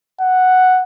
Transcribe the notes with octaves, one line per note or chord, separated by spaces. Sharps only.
F#5